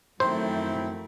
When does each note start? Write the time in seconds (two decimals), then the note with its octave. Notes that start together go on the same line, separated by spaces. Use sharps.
0.20 F#2 D#3 F3 A3 C4 E4 C5